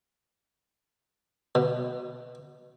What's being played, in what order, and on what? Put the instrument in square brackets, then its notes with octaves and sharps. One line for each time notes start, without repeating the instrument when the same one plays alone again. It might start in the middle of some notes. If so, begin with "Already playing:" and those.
[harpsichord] B2